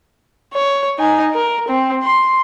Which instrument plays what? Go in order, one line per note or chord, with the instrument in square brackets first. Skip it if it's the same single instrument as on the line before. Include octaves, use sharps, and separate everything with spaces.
[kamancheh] C#5
D#4 G#5
A#4
C4
C6